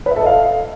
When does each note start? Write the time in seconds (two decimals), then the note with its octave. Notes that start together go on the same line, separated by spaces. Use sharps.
0.06 B4
0.11 E5
0.16 A4
0.21 D#5
0.26 F5